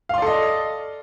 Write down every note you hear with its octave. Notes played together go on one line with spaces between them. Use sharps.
A4 D5 D#5 F5 C6